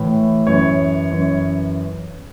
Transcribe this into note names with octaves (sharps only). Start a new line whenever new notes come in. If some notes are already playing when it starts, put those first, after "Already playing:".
Already playing: A2 E3
F#2 E3 C#5
F#2 E3